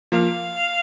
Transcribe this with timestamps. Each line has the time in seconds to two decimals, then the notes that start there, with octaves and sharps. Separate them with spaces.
0.12 F3 A#3 F5